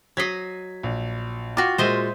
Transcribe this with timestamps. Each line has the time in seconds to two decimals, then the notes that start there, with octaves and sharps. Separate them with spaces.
0.17 F#3 D#5 G#6 B6 C7
0.83 A#1
1.57 F4 F#4 G5 D6
1.78 A#2 G#3 C5 D#5 E5